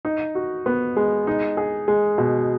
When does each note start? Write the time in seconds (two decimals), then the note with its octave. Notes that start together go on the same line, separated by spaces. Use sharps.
0.05 D#4
0.35 F#4
0.66 B3
0.96 G#3
1.27 D#4
1.57 G#4
1.88 G#3
2.18 B2